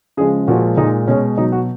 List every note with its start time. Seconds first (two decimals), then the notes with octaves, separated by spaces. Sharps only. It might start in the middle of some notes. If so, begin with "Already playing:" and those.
0.17 C#3 F3 G#3 G#4
0.48 A#2 F3 G#3 F#4
0.77 A#2 G#3 D#4
1.08 B2 G#3 C#4
1.38 B2 F#3 D#4
1.52 F#4